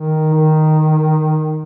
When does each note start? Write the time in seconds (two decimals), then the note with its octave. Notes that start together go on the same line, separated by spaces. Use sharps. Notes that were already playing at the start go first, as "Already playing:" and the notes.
Already playing: D#3
0.33 D#3